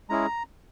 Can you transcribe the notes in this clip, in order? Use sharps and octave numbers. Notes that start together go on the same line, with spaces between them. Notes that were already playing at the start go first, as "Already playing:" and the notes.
G#3 C#4 E4 G#4 A#5